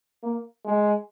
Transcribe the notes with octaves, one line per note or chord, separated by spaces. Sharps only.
A#3
G#3